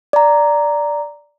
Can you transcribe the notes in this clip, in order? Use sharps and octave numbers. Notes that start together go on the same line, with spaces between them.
D5 A#5